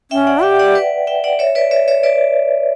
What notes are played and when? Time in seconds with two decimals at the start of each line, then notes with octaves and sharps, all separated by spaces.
0.11 C#4 E5 G5
0.27 D5 F#5
0.43 G4 E5 G5
0.59 D5 F#5
0.75 B4 D5
1.07 E5 G5
1.24 D5 F#5
1.39 C#5 E5
1.55 B4 D5
1.71 C#5 E5
1.88 C#5 E5
2.03 B4 D5